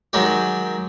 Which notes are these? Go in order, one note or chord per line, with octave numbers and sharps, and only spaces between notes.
D#3 F#3 G#3 G4